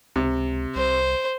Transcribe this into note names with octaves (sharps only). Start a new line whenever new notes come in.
C#2 C3
C2 C5